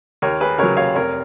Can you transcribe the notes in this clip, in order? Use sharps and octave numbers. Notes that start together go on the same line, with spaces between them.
D#2 A#4 C#5
G#4 B4
C#3 F#3 A#4 C#5
C#5 F5
F1 A#4 C#5